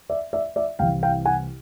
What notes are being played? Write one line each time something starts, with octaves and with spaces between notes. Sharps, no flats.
D5 E5
D5 E5
D5 E5
C2 C3 E3 F5 G5
F5 G5
F#5 G#5